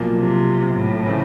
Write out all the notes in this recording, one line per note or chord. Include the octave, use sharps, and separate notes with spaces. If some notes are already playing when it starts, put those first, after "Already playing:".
Already playing: B1 A#2 F3 A#3
C3
A2
C#3 E3 A3 C4